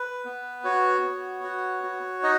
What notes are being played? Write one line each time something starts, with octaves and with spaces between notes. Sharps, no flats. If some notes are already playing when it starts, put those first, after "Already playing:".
Already playing: B4
B3
F#4 C#5
B3
F#4
F#4
D#4 D#5